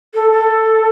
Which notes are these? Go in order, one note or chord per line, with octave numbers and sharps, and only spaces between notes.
A4
A4